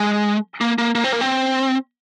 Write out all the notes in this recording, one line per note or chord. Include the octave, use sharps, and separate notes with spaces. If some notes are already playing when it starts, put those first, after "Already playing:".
Already playing: G#3
A#3
A#3
A#3
C4
A#3
C4